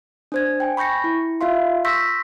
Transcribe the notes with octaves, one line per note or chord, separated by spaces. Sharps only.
D4 C5 G#6
G5 G#5
B5 C#6 G6 A#6 C#7
E4
F4 E5 F5 C6
C6 C#6 E6 G6 A#6 B6